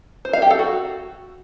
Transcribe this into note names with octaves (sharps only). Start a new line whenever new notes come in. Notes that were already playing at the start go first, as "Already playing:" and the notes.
C5
F5
G4
A4
F#4